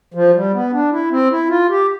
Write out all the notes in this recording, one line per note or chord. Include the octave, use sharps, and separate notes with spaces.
F3
G3
B3
D4
E4
C4
E4
F4
G4